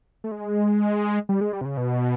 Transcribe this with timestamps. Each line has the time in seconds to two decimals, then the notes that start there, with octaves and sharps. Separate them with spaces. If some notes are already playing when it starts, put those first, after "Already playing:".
0.24 A3
0.32 G#3
1.29 G3
1.41 G#3
1.53 G3
1.61 C3
1.65 C#3
1.77 B2